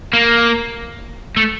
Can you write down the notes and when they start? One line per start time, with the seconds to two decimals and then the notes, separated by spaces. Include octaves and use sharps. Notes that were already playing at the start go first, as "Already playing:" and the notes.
0.13 A#3
1.37 A3